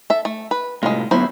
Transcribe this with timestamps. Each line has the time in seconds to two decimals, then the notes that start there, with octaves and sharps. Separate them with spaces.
0.10 A4 E5
0.25 A3
0.51 B4
0.83 A2 C3 G#3 F4
1.11 D2 F#3 B3 E4 C5